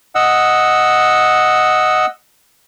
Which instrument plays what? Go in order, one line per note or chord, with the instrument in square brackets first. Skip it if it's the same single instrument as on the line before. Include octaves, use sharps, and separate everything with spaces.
[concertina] D#5 F#5 E6